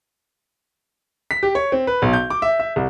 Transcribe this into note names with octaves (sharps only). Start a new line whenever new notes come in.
B6
G4
C#5
C4
B4
B1
G6
D6
E5
E5
C2